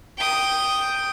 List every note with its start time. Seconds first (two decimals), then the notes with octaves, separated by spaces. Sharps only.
0.18 G5 D#6